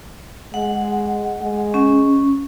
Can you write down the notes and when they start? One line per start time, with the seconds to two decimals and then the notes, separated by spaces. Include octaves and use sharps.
0.54 G#3 F#5
1.41 G#3
1.74 C#4